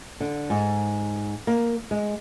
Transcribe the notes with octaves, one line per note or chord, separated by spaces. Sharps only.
D3
G#2
A#3
G#3